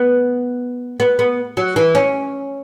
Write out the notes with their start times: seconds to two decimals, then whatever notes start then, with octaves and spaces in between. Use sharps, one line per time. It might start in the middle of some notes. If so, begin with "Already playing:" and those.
Already playing: B3
1.00 B3
1.19 B3
1.57 F#3
1.76 E3
1.95 C#4